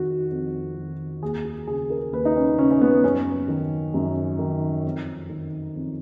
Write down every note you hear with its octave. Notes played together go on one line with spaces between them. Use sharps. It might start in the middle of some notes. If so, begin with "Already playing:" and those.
Already playing: F2 D#3 F#4
F2
D#3
D#2 G#4
G#4
C#3 G#4
A#4
D#2 B4
D#4
C#4
C#3 C#4
C#4
B3
F#2 C#4
D#3
F#2
D#3
F2
D#3
F2